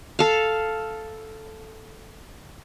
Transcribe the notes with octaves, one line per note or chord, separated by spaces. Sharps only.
A4 F5